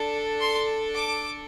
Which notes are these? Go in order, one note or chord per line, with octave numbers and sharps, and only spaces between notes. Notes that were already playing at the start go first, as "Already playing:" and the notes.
Already playing: D4 A4
C6
D6